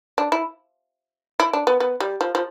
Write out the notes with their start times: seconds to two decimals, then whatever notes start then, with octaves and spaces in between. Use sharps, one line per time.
0.18 D4
0.32 E4
1.40 E4
1.53 D4
1.67 B3
1.80 B3
2.00 G3
2.21 F3
2.35 F3